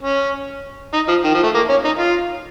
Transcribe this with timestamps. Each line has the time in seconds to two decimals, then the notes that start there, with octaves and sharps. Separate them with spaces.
0.03 C#4
0.94 D#4
1.09 F3
1.24 D#3
1.35 F3
1.44 A3
1.55 A#3
1.70 C#4
1.85 D#4
1.99 F4